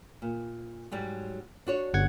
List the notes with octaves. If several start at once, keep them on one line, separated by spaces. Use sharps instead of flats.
A#2
G#2 F#3 G3
D4 F#4 C#5
G1 F#5 G#6